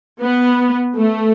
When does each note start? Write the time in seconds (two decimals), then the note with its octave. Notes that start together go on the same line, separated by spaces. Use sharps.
0.21 B3
0.97 A3